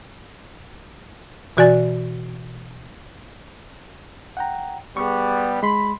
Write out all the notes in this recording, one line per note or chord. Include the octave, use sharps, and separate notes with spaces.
B2 E3 F#4 D5 G#5 A6
F#5 G5 A#5
G3 B3 G#4 C#6
G#3 B5 C6